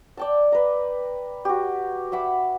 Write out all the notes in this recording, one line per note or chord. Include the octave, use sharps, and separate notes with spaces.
D5 G5 A5
B4 A#5
F#4 G4
E5 F#5 B5 D6